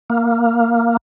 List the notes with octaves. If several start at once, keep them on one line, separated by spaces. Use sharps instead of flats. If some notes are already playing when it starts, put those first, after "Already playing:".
A#3